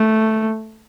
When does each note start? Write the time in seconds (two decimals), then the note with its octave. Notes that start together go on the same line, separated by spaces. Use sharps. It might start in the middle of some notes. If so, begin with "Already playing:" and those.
Already playing: A3